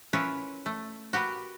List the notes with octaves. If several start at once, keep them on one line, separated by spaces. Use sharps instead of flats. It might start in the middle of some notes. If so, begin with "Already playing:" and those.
C#4 E4 F4 A#4 B4 C#5
A3
F#4 G4 A#4 B4